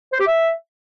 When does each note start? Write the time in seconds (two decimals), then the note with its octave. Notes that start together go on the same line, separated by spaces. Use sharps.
0.13 C5
0.20 G4
0.27 E5